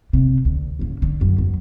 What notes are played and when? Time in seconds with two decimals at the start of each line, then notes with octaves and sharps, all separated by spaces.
0.13 C3
0.45 D2
0.79 G#1 C#3
1.02 D3
1.21 F#2
1.38 E2 F#3